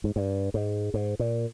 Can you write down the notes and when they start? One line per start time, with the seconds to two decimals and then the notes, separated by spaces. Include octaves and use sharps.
0.04 G#2
0.16 G2
0.54 G#2
0.94 G#2
1.19 A#2